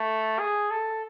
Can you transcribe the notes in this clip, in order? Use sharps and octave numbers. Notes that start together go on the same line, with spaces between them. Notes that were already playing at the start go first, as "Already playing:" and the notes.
Already playing: A3
G#4
A4